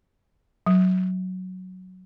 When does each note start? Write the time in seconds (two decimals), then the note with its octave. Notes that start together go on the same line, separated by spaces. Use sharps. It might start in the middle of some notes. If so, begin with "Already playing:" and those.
0.66 F#3